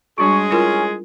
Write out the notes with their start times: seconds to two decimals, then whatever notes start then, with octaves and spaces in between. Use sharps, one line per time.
0.18 G3 G#3 D4 F#4 G#4 C#6
0.51 C#4 E4 F4 A#4